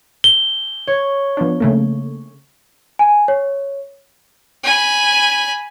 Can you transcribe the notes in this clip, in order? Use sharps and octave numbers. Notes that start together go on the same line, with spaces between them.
G7
C#5
F3 B3 D4
C#3 A3 A#3
G#5
C#5
G#5 B5